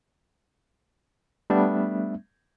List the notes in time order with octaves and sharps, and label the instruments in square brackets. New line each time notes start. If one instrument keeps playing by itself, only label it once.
[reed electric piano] G3 A3 B3 D4 E5